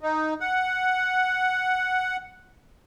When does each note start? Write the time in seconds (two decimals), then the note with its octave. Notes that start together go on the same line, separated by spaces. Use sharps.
0.01 D#4
0.40 F#5